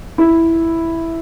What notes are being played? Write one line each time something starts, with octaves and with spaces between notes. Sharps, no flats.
E4